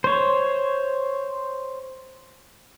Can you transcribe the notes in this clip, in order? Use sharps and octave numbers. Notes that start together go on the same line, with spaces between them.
C5 C#5